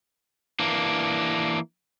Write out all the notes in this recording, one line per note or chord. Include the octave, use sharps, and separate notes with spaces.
E3 A#3 D4